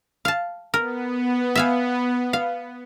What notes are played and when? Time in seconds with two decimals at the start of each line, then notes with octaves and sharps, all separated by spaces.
0.25 F5 A5
0.74 B3 A#4
1.56 E5 F5 G#5
2.33 F5